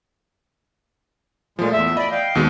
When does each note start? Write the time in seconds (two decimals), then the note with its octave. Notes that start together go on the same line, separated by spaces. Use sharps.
1.59 A#2 F3 G#3 A3
1.73 E2 E5
1.97 D5 D#5 B5
2.11 F5 G5
2.35 D#2 B2 G#3